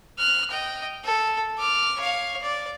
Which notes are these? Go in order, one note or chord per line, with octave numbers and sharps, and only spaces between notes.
F6 F#6
D#5 G5
A4
D6 F6
C#5 F5
D5